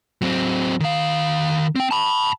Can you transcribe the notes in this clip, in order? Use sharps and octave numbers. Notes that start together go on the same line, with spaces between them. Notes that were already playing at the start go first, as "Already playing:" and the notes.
F#3 C4
D#3 F5
C4 G5
A5 B5